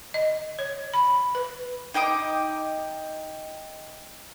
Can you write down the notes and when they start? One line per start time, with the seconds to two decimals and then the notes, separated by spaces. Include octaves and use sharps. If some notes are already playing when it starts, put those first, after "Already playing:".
0.14 D#5
0.59 C#5
0.94 B5
1.35 B4
1.94 D#4 G5 D6 D#6